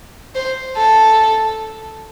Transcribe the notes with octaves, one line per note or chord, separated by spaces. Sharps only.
C5
A4